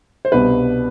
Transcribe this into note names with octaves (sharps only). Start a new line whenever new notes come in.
C5
C2 B2 B3 D4 B4